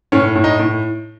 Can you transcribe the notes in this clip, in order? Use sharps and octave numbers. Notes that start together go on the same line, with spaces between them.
A2 C#4
A2
D#4
A2